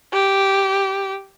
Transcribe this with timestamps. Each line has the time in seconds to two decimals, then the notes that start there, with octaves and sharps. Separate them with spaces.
0.13 G4